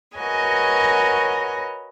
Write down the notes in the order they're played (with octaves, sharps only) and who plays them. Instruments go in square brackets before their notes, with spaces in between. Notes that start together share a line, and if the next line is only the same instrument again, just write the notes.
[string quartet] F#4 A#4 B4 C#5 D#5 G#5